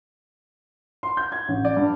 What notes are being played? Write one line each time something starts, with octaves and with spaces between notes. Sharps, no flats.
C6
G6
G#6
A1
D5
G2